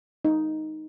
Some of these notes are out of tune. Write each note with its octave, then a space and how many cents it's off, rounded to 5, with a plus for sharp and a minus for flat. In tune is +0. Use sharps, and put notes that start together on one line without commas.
D#4 +0